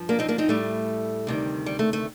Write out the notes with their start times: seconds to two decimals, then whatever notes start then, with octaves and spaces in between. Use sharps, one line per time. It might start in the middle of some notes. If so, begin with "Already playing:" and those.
Already playing: G2 F3
0.09 A#3 D4
0.19 C4 D#4
0.28 A#3 D4
0.38 C4 D#4
0.49 A2 G3 A3
1.27 D2 C3 D#3 G3
1.66 G3
1.79 A3
1.93 A3